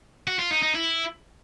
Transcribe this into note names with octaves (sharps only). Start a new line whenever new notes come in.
F#4
F4
D#4
D#4
E4